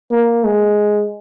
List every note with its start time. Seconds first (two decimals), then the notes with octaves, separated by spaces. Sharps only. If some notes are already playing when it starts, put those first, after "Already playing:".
0.11 A#3
0.44 G#3